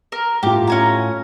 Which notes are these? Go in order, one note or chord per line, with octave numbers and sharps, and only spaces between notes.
A#4
A2 F4 G4 D6
C#4 G#5 A#5